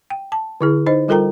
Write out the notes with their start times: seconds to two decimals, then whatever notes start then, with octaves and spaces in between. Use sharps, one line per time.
0.10 G5
0.32 A5
0.61 D3 E4 G#4
0.86 D#4 C5 D#5
1.08 G3 F4 A4 A#4 G5 A#5